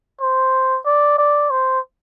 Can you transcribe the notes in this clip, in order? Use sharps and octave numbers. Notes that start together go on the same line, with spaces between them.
C5
D5
D5
C5